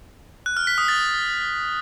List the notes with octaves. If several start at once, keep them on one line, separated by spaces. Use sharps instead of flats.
F#6
F6
B6
D#6
A6